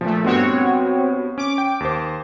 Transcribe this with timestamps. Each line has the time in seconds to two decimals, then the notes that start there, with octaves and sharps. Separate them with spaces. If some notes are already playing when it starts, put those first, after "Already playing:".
0.01 A#2 F3 A3
0.25 G2 B3 C4 F#4 C#5
1.38 C#4 D6
1.58 G5
1.80 D#2 C5